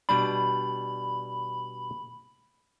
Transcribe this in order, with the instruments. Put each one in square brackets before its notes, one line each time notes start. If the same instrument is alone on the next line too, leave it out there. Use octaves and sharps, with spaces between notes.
[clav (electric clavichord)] B2 G3 D4 [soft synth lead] B5